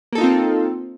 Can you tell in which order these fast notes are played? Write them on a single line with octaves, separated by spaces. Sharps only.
A#3 A4 D#4 F4 C4